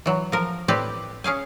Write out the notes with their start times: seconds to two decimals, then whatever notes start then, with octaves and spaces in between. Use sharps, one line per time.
0.06 E3 F#3
0.32 F3 A#4
0.68 A2 C4 G4 B4 D5
1.24 C#4 G#4 F5 G#5